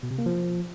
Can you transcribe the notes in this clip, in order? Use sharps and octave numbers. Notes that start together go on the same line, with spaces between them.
B2
C3
A#3
F3